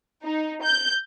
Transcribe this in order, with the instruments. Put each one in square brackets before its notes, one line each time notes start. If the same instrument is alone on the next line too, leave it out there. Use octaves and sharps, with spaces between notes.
[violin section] D#4
G6